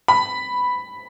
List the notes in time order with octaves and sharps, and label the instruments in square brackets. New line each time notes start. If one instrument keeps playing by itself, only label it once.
[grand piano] B5